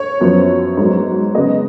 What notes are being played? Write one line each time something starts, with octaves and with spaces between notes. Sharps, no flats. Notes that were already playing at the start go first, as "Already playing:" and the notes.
Already playing: C#5
F#2 F3 B3
G#2 F#3 B3
C#3 G#3 B3 D#5